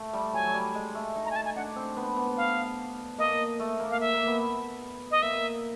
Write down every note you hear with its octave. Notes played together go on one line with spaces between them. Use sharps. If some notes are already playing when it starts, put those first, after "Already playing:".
Already playing: A3
G3
F#3 G#5
F#3
G3
G#3
A3
D#4
A#5
G#5
A5
G#5
D4 F#5
C4
B3
B3
F5
A#3 D#5
A3
A#3
F5
E5
A#3
B3
D#5
A#3 E5